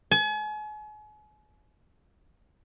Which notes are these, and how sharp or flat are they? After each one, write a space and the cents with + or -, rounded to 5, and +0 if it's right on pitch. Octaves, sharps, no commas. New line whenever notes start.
G#5 +40